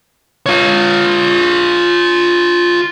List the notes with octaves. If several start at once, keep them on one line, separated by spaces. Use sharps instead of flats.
F4 C#5